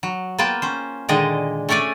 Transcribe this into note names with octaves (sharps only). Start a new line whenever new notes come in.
F#3
A#3 B3 F4 G5 A5
C#4 C5
A#2 D3 D#3 G#3 D#5
A3 C#4 C#5 D5 G#5